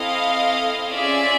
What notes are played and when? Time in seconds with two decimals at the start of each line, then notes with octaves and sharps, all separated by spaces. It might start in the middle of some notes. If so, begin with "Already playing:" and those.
Already playing: C4 E4 A4 D#5 F5
0.94 C#4 F4 G#4 D5 E5